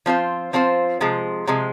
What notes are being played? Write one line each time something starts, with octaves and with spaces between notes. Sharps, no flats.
F3 C4 F4 C5
F3 C4 F4 C5
C3 F3 G#3
C3 F3 G#3